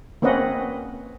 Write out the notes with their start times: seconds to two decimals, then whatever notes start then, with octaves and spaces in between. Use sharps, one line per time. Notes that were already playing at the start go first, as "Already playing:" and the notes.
0.22 A#3 C4 C#4 B4 D#5 F#5